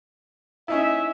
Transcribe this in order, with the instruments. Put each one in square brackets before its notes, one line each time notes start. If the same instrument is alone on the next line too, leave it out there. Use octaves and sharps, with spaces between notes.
[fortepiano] C#4 D#4 E4 [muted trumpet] E5